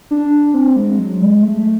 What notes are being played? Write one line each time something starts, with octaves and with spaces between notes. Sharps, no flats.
D4
C4
G#3
F#3
G#3
A3